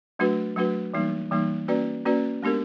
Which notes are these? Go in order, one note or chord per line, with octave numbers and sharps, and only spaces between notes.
F#3 A3 D4 F#4 B4
F#3 A3 D4 F#4 B4
E3 G3 A#3 D#4
E3 G3 A#3 D#4
A#3 C#4 F#4 B4 D5
A#3 C#4 F#4 B4 D5
G#3 B3 D4 G4 A#4